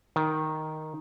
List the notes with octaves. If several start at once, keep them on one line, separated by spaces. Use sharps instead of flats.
D#3